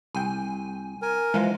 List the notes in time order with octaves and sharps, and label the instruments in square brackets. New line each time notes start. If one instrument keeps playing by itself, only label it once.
[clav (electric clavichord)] C2 G5 [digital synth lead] G#5
[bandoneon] A#4 G#5
[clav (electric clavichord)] E3 F3 [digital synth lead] G#3